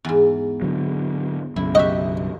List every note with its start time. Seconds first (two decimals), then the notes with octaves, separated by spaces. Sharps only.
0.05 E2 G#2
0.62 D3 F#3
1.56 B1 F#2 C#3 E4
1.75 F#4 G4 D#5 E5